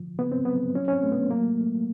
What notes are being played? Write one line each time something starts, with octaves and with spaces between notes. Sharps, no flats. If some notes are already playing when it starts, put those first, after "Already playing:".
Already playing: D3 F3
C#3 B3
C4
F#3 B3
F#3 C#4
C#4
C4
A3
B3
F#3 A#3
A3